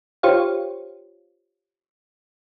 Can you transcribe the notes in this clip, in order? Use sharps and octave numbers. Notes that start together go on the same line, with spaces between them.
F4 G4 C5 C#5 F5